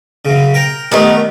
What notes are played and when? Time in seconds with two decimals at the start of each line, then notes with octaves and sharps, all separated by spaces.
0.25 F#2 C#3
0.54 A#4 G5 A#5
0.91 D#3 G3 A3 B3 A#4